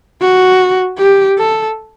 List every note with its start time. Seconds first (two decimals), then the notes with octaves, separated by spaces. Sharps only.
0.21 F#4
0.99 G4
1.38 A4